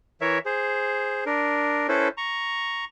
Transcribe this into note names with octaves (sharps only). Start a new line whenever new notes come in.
E3 A#4 C#5 E5
G#4 C5
D4 A#4
C#4 E4 A4 B4 C5
A#5 C#6